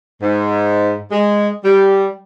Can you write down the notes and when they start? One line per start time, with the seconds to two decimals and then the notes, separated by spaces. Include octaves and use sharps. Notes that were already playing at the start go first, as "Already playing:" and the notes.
0.21 G#2
1.11 G#3
1.63 G3